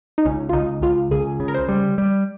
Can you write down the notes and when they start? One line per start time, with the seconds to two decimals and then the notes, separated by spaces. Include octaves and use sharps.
0.18 D#4
0.25 C#2 C#4
0.49 F4
0.53 C#2 D#4
0.82 C#2 F4
1.11 C#2 G#4
1.40 C#3
1.48 A#4
1.54 C5
1.69 G3
1.98 G3